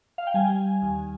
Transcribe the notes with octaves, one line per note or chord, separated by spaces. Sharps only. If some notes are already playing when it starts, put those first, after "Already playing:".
F5
G5
G3 G#5
D#2